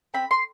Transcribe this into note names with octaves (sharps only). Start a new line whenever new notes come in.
C4 B5
C6